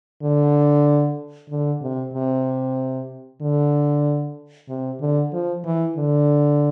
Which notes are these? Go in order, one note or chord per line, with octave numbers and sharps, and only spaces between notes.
D3
D3
C3
C3
D3
C3
D3
F3
E3
D3